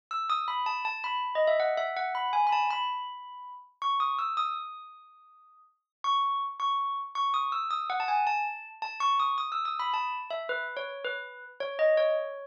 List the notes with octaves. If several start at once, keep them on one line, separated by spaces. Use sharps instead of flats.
E6
D#6
B5
A5
A5
B5
D#5
E5
F#5
E5
F#5
B5
G#5
B5
A5
B5
C#6
D#6
E6
D#6
C#6
C#6
C#6
D#6
E6
D#6
F#5
A5
G#5
A5
A5
C#6
D#6
D#6
E6
D#6
B5
A5
E5
B4
C#5
B4
C#5
D#5
C#5